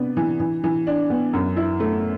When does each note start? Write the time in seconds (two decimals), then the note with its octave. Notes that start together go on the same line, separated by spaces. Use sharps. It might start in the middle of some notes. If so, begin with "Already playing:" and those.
Already playing: C3 B3 D4
0.17 E3
0.40 E3
0.64 E3
0.87 D4
1.10 B3
1.33 F#2
1.56 E4
1.80 A3